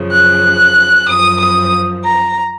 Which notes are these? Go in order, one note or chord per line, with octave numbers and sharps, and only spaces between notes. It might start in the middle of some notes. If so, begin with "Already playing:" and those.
Already playing: F#2 C#3 F3
F#6
F#2 F3 D#6
D#6
A#5